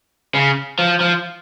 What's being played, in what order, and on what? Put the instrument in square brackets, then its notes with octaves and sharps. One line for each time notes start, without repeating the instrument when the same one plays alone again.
[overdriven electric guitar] C#3
F3
F3